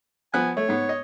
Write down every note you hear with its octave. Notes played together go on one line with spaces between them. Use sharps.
F3 B3 G#5 F#6
A3 C#5
G#2 B3
D#5